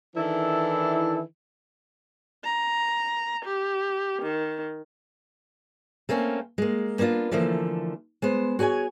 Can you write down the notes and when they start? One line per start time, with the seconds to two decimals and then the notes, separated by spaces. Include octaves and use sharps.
0.16 D#3 E3 D4 E4 A4
2.44 A#5
3.45 G4
4.22 D#3
6.09 A3 A#3 C4 C#4
6.58 G#3 A#3
6.99 A#3 B3 D4 F4
7.31 D3 E3 F3 A3 A#3
8.22 G#3 B3 C5
8.59 F#4 G#4 C#5 G5 G#5